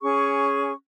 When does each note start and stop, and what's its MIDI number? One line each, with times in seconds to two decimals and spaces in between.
0.02 0.71 61
0.02 0.71 68
0.02 0.71 85